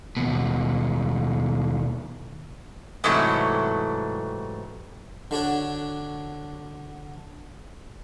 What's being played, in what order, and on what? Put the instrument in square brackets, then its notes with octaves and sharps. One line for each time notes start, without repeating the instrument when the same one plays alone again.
[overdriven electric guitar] D#2 B2
[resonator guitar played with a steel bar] G#2 C3 E3 F#3 A3
[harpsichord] D3 D4 F#4 C#5